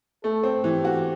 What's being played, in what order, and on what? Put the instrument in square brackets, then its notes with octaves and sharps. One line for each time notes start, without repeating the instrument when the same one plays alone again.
[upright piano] A3 [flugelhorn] A4
[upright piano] C4
[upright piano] E3 [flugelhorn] G4
[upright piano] F#4